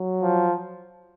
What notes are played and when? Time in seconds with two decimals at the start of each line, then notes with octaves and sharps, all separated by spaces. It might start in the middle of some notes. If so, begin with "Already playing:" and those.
Already playing: F#3
0.22 F3